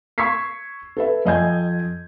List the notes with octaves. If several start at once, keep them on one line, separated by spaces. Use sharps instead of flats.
C#6 E6 G#6 B6 C7
A4 B4 E5
F2 D#5 G#5 G6 G#6